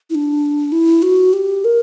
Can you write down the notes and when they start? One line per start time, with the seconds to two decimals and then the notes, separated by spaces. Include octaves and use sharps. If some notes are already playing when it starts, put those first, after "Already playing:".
0.10 E4
0.15 D4
0.72 E4
1.02 F#4
1.33 G4
1.65 A#4